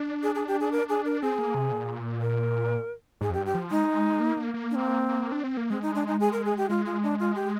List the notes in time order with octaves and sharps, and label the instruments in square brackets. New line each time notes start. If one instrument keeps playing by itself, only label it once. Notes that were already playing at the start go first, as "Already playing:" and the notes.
Already playing: [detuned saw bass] D4
[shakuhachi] G#4
G#4
G4
G#4
A#4
G#4
A#4
[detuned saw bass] C4 [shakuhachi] G#4
[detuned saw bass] A#3
C3
A#2
[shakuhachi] A#4
[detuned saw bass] G#2 [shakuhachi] G#4
[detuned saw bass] F2
[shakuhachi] G4
[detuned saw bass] G2
[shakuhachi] G4
[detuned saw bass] F3
[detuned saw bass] G#3 [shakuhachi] D#4
[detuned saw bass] A#3
A#3
A#3
[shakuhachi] D4
C4
[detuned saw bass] D4
C4
A#3
[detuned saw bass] G#3 [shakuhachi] C4
[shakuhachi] D#4
D4
D#4
G#4
A#4
G#4
G4
[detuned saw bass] G#3 [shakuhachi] F4
[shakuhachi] F4
D4
F4
G4